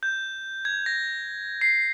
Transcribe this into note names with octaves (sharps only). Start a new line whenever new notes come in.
G6
G#6
A#6
C7